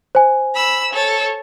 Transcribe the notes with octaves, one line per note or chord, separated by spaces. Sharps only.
C5 G#5
B5 E6
A4 C#5